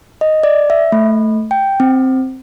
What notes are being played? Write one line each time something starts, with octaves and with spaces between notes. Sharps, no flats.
D#5
D5
E5
A3
G5
C4